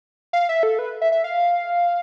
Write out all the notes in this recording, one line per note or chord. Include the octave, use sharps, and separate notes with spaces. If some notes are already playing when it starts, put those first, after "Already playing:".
F5
E5
A4
B4
E5
E5
F5